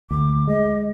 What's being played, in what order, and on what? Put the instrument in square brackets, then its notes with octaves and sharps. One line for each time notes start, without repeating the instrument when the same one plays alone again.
[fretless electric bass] D2 [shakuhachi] D6
[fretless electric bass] G#3 [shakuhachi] D#5